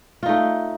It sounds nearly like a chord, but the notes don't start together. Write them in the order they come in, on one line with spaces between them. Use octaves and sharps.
F4 D#4 A3